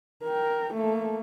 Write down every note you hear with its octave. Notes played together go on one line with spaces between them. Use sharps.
A#4 G5
A3 A#3